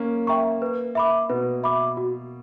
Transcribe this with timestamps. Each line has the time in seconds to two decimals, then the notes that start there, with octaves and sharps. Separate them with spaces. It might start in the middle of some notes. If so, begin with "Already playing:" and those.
Already playing: A#3 C#4
0.27 E5 G5 A#5 C#6
0.62 B4
0.95 E5 B5 D6
1.29 B2 B4
1.63 E5 B5 D6
1.97 F#4